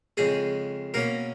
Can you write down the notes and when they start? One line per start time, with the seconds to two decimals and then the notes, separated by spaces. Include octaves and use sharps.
0.17 F2 C#3 G#3 G#4
0.94 B2 A#3 C#4 A#4